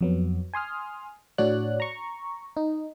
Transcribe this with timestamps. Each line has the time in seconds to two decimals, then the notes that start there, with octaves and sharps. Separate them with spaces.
0.01 F2 F#3 B3
0.54 G#5 C6 D#6 F6
1.38 A2 D4 F#4 C#5 D5 F#6
1.80 A#5 C#6
2.57 D#4